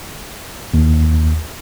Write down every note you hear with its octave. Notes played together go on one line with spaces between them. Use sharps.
D#2